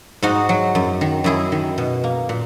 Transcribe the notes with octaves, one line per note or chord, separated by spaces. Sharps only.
G#2 D#4 F#4
F#3
F#2
D#3
F#2 E4 G#4
D#3
B2
A#3
A#2